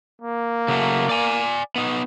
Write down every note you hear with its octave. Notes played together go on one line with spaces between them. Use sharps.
A#3
C#3 F#3 A3
D5 G#5
B3 D#4